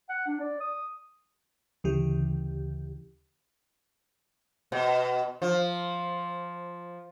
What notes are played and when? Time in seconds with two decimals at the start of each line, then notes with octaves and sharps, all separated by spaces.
0.09 F#5
0.27 D4
0.40 D5
0.60 D#6
1.84 D2 C#3 E3 G4
4.72 B2
5.42 F3